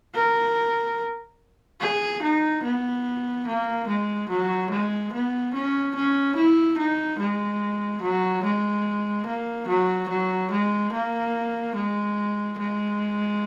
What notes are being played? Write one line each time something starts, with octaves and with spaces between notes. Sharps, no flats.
A#4
G#4
D#4
B3
A#3
G#3
F#3
G#3
B3
C#4
C#4
E4
D#4
G#3
F#3
G#3
A#3
F#3
F#3
G#3
A#3
G#3
G#3